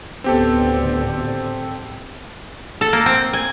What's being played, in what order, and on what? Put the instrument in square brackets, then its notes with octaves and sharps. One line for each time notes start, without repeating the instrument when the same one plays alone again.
[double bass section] D2 A2 D3 [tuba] B3 [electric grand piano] C4 G4 A4
[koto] A4
A#3
C4
G#5